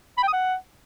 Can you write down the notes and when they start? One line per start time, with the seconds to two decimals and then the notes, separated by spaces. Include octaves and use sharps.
0.18 B5
0.23 G5
0.28 D#6
0.33 F#5